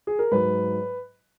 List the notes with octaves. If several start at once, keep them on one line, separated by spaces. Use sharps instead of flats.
G#4
A#4
G#2 F#3 B4